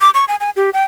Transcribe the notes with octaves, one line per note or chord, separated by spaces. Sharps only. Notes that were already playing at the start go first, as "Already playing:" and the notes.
D6
C#6
G#5
G#5
G4
G5